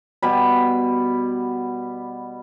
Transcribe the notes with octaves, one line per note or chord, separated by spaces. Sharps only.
B2 G3 B5